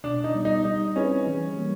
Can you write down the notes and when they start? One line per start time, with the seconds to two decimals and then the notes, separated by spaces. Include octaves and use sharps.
0.04 B2 D4
0.24 D#4
0.35 G3 B3
0.45 D#4
0.65 G3 D#4
0.96 C4 C#4 E4 G#4 B4
1.27 E3
1.57 G3 A#3